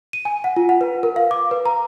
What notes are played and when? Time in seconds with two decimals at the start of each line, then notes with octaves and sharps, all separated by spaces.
0.13 D#7
0.25 G#5
0.44 F#5
0.57 F4
0.69 F#5
0.81 B4
1.03 A#4
1.16 F5
1.31 D6
1.51 B4
1.66 A#5